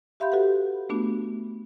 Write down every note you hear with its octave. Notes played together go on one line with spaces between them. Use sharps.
G4 E5 F5 B5 C6 G6
F#4 G4 A4 B4 F#5
A3 B3 D4 F#4